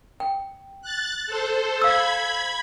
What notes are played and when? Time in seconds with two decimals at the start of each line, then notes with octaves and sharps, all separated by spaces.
0.20 G5
0.82 F#6 A6
1.27 A4 C5
1.82 F5 B5 E6 G#6